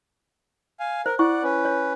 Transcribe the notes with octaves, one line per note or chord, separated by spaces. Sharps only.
F5 G#5
A#4 C5
E4 D5 F#5 C#6
C#4 B4
C#5